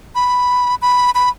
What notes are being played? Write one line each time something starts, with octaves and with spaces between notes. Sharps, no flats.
B5
B5
B5